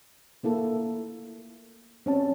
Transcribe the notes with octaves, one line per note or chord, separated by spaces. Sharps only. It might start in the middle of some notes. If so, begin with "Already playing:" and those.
A3 A#3 E4 A4
C4 C#4 A5